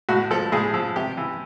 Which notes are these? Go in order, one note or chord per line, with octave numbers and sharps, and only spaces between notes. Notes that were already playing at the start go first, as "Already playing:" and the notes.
A2 F#4
F3 A4
A2 G#4
F3
C3 G4
E3